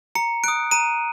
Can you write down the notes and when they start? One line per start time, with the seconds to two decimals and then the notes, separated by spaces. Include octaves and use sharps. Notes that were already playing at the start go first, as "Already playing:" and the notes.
0.15 A#5 C#7
0.44 D#6 F#6 D7
0.71 A#5 D#7